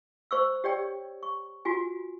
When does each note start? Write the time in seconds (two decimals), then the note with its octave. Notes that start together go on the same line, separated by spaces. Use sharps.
0.31 C5 C#6 E6
0.64 G4 C#5 D5 G5
1.23 C#6
1.65 F4 F#4 G#5